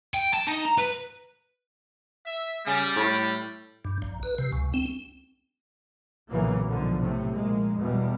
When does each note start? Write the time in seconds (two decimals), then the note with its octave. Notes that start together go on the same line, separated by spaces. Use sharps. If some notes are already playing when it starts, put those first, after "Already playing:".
0.14 G5
0.33 A5
0.47 D#4
0.65 A#5
0.78 B4
2.27 E5
2.67 C#3 G3
2.96 A2
3.85 G2
4.02 A#1
4.23 B4
4.38 C3
4.52 C#2
4.74 C4
6.30 B1 A#2 C#3 E3 F#3 A#3
6.66 B1 G#2 D3 F3
7.00 A2 C3 A3
7.33 A#1 G#3 A#3
7.79 E2 B2 G3